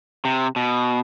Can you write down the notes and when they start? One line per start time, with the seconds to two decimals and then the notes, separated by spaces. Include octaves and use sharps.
0.25 C3
0.56 B2